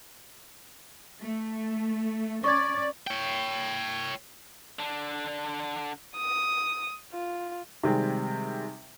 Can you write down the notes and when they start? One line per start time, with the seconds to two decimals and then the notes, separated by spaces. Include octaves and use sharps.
1.20 A3
2.44 C#4 D5 C#6 D6 G#6
3.07 C#5 G5
4.79 D3 D4
6.17 D#6
7.13 F4
7.83 C3 D#3 G3 G#3 C4